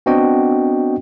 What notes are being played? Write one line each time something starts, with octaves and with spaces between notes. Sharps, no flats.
B3 C4 D4 F#4 D#5 G5